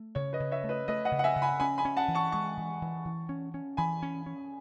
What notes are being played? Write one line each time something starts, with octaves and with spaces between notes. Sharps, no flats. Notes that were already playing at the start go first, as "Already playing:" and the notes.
Already playing: A3
C#3 C#5
B4 D#5
C#3
C#5 E5
A3
B4 D#5
A3 B4 D#5
D#5 F#5
C#3
F#5
E5 G#5
C#3
G#5 B5
C#4 G#5 B5
G#5 B5
C#4
F#5 A5
E3
A5 C#6
G#3 A5 C#6
E3
E3
E3
C#4
C#4
E3 G#5 B5
C#4
C#4